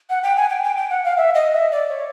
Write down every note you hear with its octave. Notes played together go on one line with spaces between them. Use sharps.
F#5
G5
G#5
G5
G5
G5
F#5
F5
E5
D#5
E5
D5
C#5